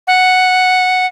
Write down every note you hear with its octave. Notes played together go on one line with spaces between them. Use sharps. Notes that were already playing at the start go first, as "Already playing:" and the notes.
F#5